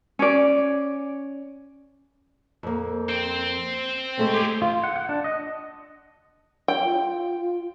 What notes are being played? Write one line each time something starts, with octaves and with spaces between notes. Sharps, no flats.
C#4 D5
F2 A#3
C5 G5
G#3 A3 C4
G4 G#4
F4
F#5
F#5
D4
D#5
G5
F4